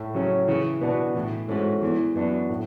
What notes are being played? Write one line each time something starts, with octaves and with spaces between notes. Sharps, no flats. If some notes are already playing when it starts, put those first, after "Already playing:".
Already playing: A2
C#3 F#3 C#4
C#3 E3
B2 B3 D4 F#4
A2 E3
G#2 A3 C#4 F#4
E2 E3
F#2 B3 D4 F#4
A2